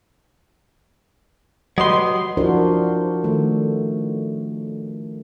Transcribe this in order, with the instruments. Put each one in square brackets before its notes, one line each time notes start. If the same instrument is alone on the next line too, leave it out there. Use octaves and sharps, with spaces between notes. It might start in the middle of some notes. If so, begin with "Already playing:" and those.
[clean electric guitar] F#3 C6 [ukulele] G4 B4 D#5
[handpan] F3 D4 E4 F#4 A#4 C5
D#3 A3